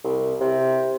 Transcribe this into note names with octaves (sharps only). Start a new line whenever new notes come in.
C2
C3